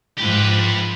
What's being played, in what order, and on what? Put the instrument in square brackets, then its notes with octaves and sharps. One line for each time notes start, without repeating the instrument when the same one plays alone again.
[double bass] G#2 F3 [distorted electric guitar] G4 B4